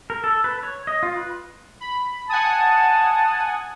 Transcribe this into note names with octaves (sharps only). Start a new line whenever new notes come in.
A#4
A4
B4
C#5
D#5
F4
B4
B5
F#5 G#5 A5 D#6